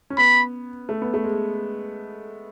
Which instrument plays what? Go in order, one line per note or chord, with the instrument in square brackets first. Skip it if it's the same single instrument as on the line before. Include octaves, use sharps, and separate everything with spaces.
[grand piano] C#4
[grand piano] B3 [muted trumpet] B5
[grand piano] A3
B3
A3
G#3